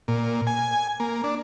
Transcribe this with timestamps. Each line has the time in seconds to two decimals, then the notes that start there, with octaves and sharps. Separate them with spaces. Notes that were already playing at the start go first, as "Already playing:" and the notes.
0.08 A#2
0.47 G#5
1.00 A#3
1.24 D4